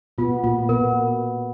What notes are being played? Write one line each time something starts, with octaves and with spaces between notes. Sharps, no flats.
B2 B3 F4
A#2 A#3 F4
B2 B3 A#4